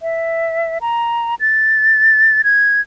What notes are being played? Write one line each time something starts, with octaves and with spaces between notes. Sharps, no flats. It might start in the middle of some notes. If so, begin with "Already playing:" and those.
E5
A#5
A6
G#6